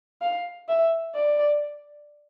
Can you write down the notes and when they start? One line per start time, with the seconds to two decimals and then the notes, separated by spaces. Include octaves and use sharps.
0.22 F5
0.68 E5
1.15 D5